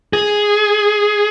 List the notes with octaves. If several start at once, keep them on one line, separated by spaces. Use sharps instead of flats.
G#4